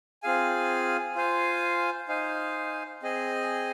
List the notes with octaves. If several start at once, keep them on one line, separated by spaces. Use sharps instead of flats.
C4 F4 G#4 F5 G#5
F4 C5 F5 G#5
D#4 C5 F5 G#5
C4 G#4 D#5 G#5